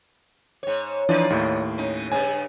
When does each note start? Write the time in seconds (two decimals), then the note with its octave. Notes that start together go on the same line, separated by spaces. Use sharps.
0.63 G#2 C#5
1.09 E3 F3 D4 D#4 F4 D5
1.30 D#2 A2
1.78 C#4 D#4
2.12 G2 C#3 G#5